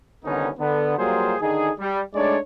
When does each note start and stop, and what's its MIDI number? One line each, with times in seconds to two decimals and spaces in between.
0.25 0.49 36
0.25 0.49 50
0.25 0.49 51
0.25 0.49 59
0.25 0.49 61
0.25 0.49 63
0.59 0.96 50
0.59 0.96 59
0.98 1.35 54
0.98 1.35 55
0.98 1.35 58
0.98 1.35 65
0.98 1.35 68
0.98 1.35 72
1.41 1.70 50
1.41 1.70 51
1.41 1.70 63
1.41 1.70 68
1.79 2.00 55
2.14 2.37 56
2.14 2.37 57
2.14 2.37 62
2.14 2.37 63
2.14 2.37 73
2.14 2.37 74